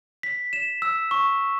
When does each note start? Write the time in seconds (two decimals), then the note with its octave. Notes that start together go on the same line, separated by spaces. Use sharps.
0.23 B6
0.53 E7
0.82 E6
1.11 C#6